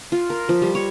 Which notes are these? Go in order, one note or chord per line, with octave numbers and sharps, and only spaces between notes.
F4
A#4
F3
G3
C#5